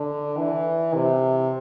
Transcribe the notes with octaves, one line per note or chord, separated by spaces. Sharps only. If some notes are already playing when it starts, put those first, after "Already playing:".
Already playing: D3
E3
C3